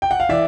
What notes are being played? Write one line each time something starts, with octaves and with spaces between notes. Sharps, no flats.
G5
F#5
F5
E3 D5 E5